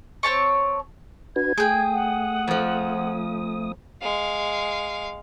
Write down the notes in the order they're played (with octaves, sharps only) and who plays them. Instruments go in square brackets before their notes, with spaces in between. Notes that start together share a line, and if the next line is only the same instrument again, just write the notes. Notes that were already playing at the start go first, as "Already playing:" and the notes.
[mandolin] C4 C#5 A5 C#6
[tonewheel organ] D4 F#4 B4 [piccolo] G#6
[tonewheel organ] A3 D#6 [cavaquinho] G#4 G5
[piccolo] F#5
[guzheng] F2 F3
[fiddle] G#3 F5